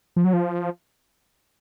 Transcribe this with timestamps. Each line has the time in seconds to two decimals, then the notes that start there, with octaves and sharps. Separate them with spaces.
0.16 F3
0.25 F#3
0.33 F3